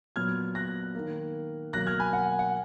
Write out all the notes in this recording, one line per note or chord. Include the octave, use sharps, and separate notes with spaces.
A#2 F#3 B3 F6 G#6
F#6 A#6
D#3 A#3
B2 F#3 A#3 F#6 A#6
F6 G#6
G#5 B5
F#5
F#5